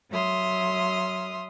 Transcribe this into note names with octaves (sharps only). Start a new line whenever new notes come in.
F#3 E5 C6 D#6 F6